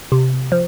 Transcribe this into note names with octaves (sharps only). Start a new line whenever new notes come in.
C3
F3